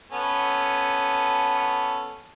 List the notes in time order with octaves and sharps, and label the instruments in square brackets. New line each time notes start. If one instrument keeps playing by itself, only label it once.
[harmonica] B3 C#4 A4